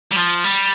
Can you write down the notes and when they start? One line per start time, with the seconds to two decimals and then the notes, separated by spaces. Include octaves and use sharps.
0.11 G3
0.16 F3
0.44 G3